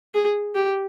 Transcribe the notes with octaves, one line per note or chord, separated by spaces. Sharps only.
G#4
G4